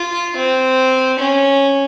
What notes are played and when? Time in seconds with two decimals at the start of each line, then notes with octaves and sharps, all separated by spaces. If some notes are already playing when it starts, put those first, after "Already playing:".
Already playing: F4
0.36 C4
1.19 C#4